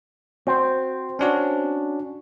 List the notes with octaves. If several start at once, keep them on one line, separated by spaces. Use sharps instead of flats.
C4 F#4 C5
C#4 D4 F#4